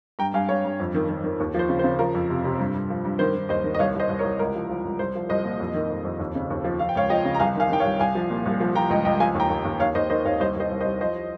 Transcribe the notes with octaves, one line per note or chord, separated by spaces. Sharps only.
G2 G5 A#5
G2 F5 G#5
G2 C#5 F5
G2
F2
D#3
D#3
D#3
D#2
F3 C5
C#3
C5
C#3
F3 A#4
F2
C3
C3
G2
G2
F3
G2
D#3 C5
D#3
D#2 C5 D#5
D#3
D#5
C2 C#5 F5
C2 C5 D#5
C2
A#4 C#5
C2
C#2 A#4
F3
F3
C#2
C2 C5
F3
C2 C5 D#5
A#2
F2
D#3
F2
F2
D#2
C#3
D#2
F3
F3 F5
G5
C#2 C#5 F5
F3 D#5 G5
C#3
A#5
C2 F5 G#5
D#3 F5 G#5
D#3 G5
C#5 F5
C2
C2 F5 G#5
F3
A#2
C2
F3
F3 G5 A#5
C#2 D#5 G5
C#2 D#5 G5
F3 F5 G#5
D#2
G5 A#5
D#2
D#2
D#2 C#5 F5
D#2 C5 D#5
D#3 C5 D#5
D#2 C#5 F5
C2 C5 D#5
C2 C5 D#5
C2
C5 D#5
C2
F3 C5 D#5